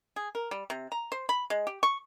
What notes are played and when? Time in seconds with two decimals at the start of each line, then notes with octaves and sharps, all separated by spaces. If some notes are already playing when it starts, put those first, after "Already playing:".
0.16 G#4
0.35 A#4
0.51 G3
0.70 C3
0.92 A#5
1.12 C5
1.29 B5
1.50 G#3
1.67 G4
1.83 C#6